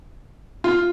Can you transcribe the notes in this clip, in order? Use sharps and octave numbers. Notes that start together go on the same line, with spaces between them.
F4